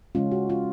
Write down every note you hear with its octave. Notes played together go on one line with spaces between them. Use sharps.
C#3 G#3 C#4 F4
F#4
F4